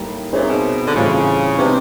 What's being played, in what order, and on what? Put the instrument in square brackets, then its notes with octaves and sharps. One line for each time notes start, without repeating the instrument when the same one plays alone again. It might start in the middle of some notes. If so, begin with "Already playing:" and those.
Already playing: [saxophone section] A2 [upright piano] G3 A#3 D#4
[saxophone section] A#2 [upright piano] C4 D#4 G#4 C#5 E5
[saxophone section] B2
D3
[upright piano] A2 E3 G3 C4 F4 [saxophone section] C#3
[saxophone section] C3 [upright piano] B3 D#4 G4 C5